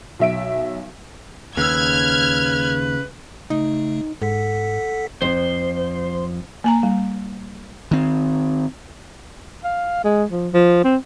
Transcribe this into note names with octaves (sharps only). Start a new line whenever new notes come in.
B1 E5 D7
D#2 C#3 B4 E6 F6 G#6
C#3 A3 D#4
G#2 A4 F#5 B6
F2 F3 C5
A#3 G#5 A#5
G3
D#3 C4
F5
G#3
F3
F3
C4